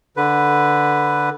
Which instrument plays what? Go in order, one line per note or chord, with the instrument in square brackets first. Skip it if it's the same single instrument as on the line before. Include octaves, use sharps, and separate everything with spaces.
[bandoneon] D3 B4